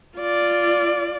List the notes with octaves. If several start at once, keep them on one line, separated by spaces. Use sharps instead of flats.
F4 D5